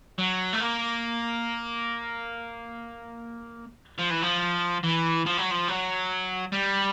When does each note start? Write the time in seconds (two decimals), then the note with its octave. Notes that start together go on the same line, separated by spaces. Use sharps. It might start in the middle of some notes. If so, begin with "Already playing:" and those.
0.19 F#3
0.53 A3
0.61 A#3
3.98 F3
4.10 E3
4.22 F3
4.83 E3
5.26 F3
5.37 F#3
5.51 F3
5.68 F#3
6.52 G3